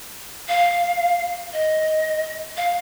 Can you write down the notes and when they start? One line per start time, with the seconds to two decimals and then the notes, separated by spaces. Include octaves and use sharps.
0.48 F5
1.53 D#5
2.57 F5